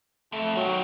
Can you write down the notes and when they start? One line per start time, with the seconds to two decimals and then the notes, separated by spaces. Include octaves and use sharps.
0.32 F2 A3
0.55 B2 D#3 F#3